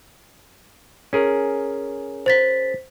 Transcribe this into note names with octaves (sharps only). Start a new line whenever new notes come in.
C#4 G#4 A#4
C5 A6 B6